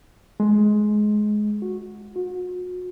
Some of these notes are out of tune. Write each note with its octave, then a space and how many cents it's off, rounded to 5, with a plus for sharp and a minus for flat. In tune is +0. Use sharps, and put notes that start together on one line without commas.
G#3 +20
F#4 -15
F#4 -40